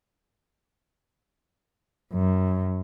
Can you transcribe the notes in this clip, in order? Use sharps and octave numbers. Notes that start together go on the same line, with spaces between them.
F#2